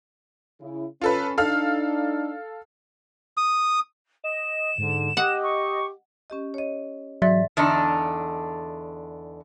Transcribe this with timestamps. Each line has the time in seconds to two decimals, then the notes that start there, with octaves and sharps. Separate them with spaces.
0.60 C#3 E4
1.01 C#4 F4 A4 B4
1.38 D4 D#4 A4 F5 F6
3.37 D#6
4.24 D#5 E7
4.78 G#2 D3
5.17 G4 D#5 F#5
5.43 C#6
6.30 C#4 G4 D#5
6.54 C#5 D#5
7.22 G#2 E3 F#3 D5 E5 A6
7.57 E2 D3 D4 D#4